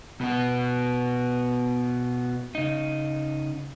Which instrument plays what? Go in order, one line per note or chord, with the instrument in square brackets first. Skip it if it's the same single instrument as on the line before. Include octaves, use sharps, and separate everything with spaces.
[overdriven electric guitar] B2 B3
[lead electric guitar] C#3 D#4